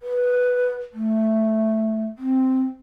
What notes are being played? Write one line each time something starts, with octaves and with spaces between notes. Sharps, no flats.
B4
A3
C4